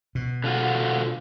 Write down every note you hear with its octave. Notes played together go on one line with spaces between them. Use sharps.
B2
D3 F4 F#4